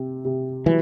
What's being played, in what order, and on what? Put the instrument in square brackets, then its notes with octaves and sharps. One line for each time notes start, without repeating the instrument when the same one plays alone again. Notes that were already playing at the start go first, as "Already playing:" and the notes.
Already playing: [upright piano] C3 C4
C3
[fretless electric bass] E3 [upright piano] F#3